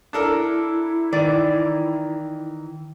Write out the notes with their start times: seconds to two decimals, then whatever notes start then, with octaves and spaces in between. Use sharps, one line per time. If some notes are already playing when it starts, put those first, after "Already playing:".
0.13 D4 E4 A4 A#4
1.13 D#3 E3 D5